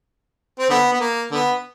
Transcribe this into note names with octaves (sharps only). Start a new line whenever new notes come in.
C4
D3 B3
B3
A#3
D3 B3